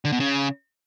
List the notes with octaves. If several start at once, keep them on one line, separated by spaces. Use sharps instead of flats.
D3
B2
C#3